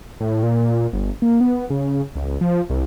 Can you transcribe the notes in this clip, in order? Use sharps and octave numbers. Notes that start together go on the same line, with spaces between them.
A2
A#2
G1
A#3
B3
C#3
C#2
F3
C2